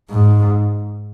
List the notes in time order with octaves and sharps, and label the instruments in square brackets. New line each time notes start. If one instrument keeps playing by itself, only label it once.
[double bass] G#2